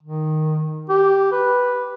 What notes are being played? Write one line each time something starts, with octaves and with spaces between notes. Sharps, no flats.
D#3
G4
B4